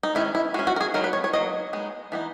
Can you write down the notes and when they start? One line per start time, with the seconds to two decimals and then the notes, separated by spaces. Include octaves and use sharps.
0.03 D#4
0.15 D#3 G#3 C#4 E4
0.35 E4
0.54 G#3 C#4 F#4
0.67 F#4
0.76 A#4
0.81 G#4
0.94 F#3 B3 D#4 A#4
1.04 B4
1.13 C#5
1.24 C#5
1.33 F#3 A#3 D#5
1.73 G#3 B3 D#4
2.12 E3 B3 D#4